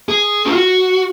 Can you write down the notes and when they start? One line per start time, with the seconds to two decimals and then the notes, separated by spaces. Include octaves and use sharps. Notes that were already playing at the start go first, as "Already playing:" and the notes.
0.09 G#4
0.46 F4
0.54 F#4